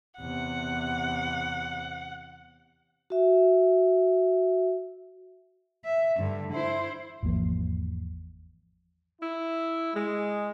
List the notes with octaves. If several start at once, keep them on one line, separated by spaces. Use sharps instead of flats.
E2 C3 F#5
F#4 E5
E5
G2 D3
E4 C5
G#1 E2 F3 A#3
E4
G#3